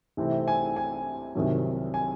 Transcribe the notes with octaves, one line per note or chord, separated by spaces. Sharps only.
C2 C3 E3 A3 C4
G#5
G#5
C2 C3 D#3 F#3
G#5